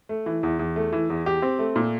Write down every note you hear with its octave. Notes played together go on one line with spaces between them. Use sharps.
A3
E3
E2
E2
A3
E3
E2
G4
C4
A3
A#2